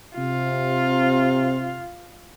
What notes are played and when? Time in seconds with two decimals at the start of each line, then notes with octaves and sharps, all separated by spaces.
0.18 C3 F4